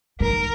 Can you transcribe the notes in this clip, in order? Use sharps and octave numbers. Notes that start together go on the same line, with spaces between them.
D#3 A#4